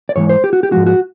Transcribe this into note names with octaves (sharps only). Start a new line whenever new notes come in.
D5
G#2 E3 G#3 C#5
C5
G4
F#4
G4
G#2 F3 G#3 F#4
F#4